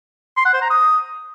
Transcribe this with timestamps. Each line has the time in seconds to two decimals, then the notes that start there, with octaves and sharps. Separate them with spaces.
0.37 C6
0.45 F#5
0.54 C5
0.62 A#5
0.70 D#6